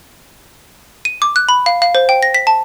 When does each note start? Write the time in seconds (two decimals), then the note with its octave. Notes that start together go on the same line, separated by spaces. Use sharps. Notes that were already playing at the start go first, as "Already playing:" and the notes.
1.05 D#7
1.22 D6
1.36 F#6
1.49 B5
1.66 F5
1.82 F5
1.95 C5
2.09 G5
2.23 A#6
2.34 B6
2.47 A5